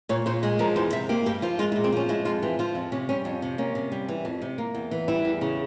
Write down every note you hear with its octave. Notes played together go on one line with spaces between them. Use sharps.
A#2 C#5
A#2 C5
G#3 G#4
F3 A#4
E2 C5
C3 E5
A#3 G4
G2 G4
F3 F4
G#3 F4
E4
A#2
C4
F3 C#4
G#3 E4
F2 F4
E3 G4
F3 F4
F2
C3 C#4
G3 C#4
F2
C3
A#3 C#4
C3
G3
E3
F2
C3
A#3
E2
E3
G3 E4
E2
C#3